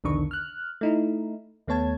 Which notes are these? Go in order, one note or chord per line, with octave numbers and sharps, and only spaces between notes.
B1 E2 D3 D#3 D4 C#6
F6 F#6
A3 D#4 E4
D#2 A3 B3 C#5 A5 G#6